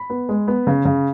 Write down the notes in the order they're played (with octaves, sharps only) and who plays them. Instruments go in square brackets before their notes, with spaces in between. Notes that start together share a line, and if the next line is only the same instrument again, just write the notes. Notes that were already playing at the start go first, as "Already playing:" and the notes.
Already playing: [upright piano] B5
B3
G#3
B3
C#3
C#3